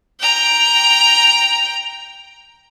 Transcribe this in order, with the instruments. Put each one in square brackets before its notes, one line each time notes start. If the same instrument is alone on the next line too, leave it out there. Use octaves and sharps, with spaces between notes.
[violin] G5 A#5